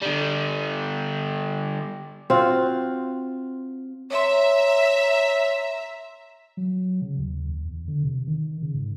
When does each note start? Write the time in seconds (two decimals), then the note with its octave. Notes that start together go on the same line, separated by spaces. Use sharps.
0.02 D3 G3
2.30 C4 F4 F#4
4.11 C#5 E5 A#5 C6
6.57 F#3
7.02 C#3
7.18 D#2
7.48 D#2
7.65 E2
7.88 D3
8.04 C3
8.27 D#3
8.62 C#3
8.74 G#2